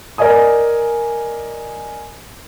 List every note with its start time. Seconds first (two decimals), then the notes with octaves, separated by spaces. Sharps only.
0.18 A#4 D5 D#5 G#5 D#6